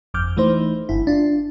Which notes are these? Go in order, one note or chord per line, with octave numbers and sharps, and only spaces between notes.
G1 F2 D6 F6 G6
E3 A3 D#4 C5
G1 E4
D4 F4